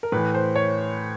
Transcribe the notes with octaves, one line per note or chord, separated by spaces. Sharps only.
A#4
A2 E3 B4
C5
C#5